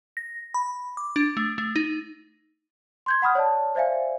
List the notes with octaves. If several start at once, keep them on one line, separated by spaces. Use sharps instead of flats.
A#6
B5
D6
D4
A3
A3
D#4
C6 G6 G#6
F#5 B5 D#6 F6
C#5 D5 A5
C5 D5 E5 F5 G#5